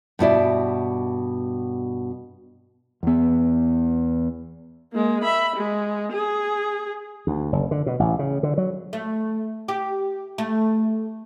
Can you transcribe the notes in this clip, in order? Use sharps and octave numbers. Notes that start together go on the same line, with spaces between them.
G2 B2 E4 D5
E2 B3
G#3 A#3
E5 B5
G#3
G#4
D2
F#1
D3
B2
A1
C#3
D3
F#3
A3
G4
A3